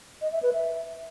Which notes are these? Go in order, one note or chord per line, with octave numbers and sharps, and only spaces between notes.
D#5
E5
B4
E5